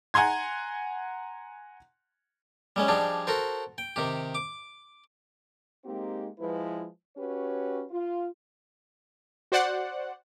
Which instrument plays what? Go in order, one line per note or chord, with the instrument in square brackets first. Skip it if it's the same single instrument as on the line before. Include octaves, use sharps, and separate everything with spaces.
[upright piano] F#5 G#5 A#5 C6 G#6
[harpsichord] G3 G#3 C#4
F3 G3 D4 D#4 G#4
F#4 A4 A#4 C5
G5
C3 D#3 G4
D6
[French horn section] G#3 A#3 C4 D#4 G4
F3 G#3 E4 B4
C#4 F#4 G4 B4 C#5
F4
[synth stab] F#4 C5 D5 F#5